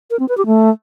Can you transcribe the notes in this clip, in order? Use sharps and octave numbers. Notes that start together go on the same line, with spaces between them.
A#4
C4
B4
G4
A3